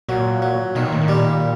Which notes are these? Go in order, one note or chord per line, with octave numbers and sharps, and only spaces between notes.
A#2 F#3
F#3
B2 D#3
A#2
A2
A#2
G3